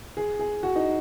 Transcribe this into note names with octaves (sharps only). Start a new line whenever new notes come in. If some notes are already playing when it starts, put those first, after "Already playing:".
G#4
G#4
F#4
D#4